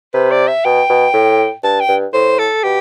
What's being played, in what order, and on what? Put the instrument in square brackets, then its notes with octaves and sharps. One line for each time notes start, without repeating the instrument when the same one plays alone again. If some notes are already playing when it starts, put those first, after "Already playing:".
[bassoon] C3 [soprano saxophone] B4
[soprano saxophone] D5
E5
[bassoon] B2 [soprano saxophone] G5
[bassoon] B2
A2
[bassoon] G2 [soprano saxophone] A5
[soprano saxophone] G5
[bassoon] G2
[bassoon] A2 [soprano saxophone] C5
[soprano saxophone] A4
[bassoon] B2 [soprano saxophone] G4